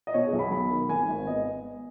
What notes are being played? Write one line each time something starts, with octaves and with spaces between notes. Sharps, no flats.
D#5
B2 C#5
G#4
B1
B5
F#3 B5
D#3
G#1 G#5
G#1
B3 D#5